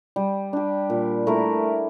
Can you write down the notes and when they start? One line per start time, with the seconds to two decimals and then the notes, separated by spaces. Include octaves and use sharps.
0.16 G3
0.53 D4 G4
0.90 A#2
1.27 A3 E4 A#4